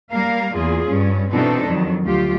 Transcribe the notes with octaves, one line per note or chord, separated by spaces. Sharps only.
G3 A#3 A#4 F5
E2 A#3 F4 G#4
G2 C#4
B2 E3 C4 D4 D#4 A4
F2 D#3 F#3
D2 F#3 F4 G4